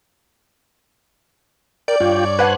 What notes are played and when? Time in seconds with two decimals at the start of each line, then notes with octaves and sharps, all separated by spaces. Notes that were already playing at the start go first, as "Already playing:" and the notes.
1.88 A#4 D5 G5
2.00 G2 F4 C#5 G5
2.39 B4 C5 F#5 G#5 A5 F#6